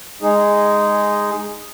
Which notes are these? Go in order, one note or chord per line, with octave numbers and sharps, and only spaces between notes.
G#3 D#4 G#4